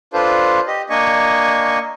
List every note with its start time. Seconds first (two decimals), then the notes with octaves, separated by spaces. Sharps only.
0.13 D4 F4 A4 B4 C5
0.67 G4 D#5
0.90 A#3 D4 D#5 G#5 C#6